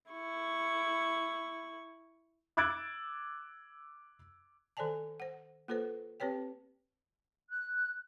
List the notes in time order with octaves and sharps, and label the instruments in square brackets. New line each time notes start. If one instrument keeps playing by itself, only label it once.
[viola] E4 C#6
[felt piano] D6 E6 F#6 G#6 A6 D7
[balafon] D#3 A4 C5 D5 G#5 A5
C5 F#5
A#3 F4 A4 B4 C5
C4 G4 B4 C#5 G5
[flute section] F#6